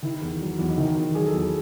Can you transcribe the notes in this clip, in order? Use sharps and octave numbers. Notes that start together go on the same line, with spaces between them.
D#3 E4
E2
F#3
E2
D#4
D#3 E4
E2
F#3 G#4
A4
E2 G#4